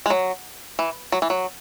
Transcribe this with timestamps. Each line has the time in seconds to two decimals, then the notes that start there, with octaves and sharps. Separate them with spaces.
0.06 G#3
0.10 F#3
0.79 E3
1.12 F#3
1.22 E3
1.30 F#3